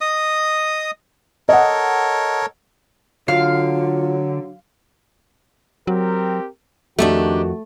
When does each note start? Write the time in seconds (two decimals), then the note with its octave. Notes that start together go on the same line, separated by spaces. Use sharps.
0.01 D#5 D#6
1.49 A4 A#4 C#5 D#5 F#5
3.28 D3 F#3 F4 F5
5.87 F#3 C4 G4 A#4
6.99 F2 D#3 F3 A3 D4 D#4 F#4 G4